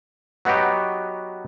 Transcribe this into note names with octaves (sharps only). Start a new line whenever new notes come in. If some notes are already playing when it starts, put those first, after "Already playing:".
F#3 B3 D#4 F#4 G4